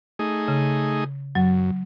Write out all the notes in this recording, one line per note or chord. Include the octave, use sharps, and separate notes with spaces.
A3 D#4 G#4
C#3
F#2 F#3